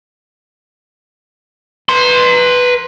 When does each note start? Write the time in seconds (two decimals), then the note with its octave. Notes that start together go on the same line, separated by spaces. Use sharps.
1.89 B4 C6